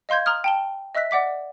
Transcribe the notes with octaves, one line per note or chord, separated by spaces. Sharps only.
D#5 F5 C6 G6 G#6
A#5 C6 D#6 F6
G5 A5 G7
D#5 E5 E6 F#6 B6
D5 F#5 D6 B6